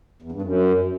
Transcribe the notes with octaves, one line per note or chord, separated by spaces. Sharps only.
E2
G2
F#2